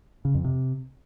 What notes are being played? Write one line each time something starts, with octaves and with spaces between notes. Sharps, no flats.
C#3
F2
C3